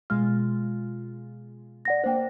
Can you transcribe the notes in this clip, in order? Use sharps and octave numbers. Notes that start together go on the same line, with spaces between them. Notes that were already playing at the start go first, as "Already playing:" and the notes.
B2 G#3 F4 F6
D5 F#5 A#6
A#3 D4 C5 G5